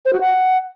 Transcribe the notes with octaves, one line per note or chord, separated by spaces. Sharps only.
C5
F#4
F#5